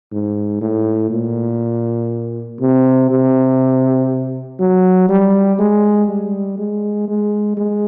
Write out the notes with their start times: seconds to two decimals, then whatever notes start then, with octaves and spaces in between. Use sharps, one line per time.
0.12 G#2
0.61 A2
1.11 A#2
2.61 C3
3.11 C3
4.60 F#3
5.09 G3
5.59 G#3
6.09 G3
6.58 G#3
7.08 G#3
7.57 G#3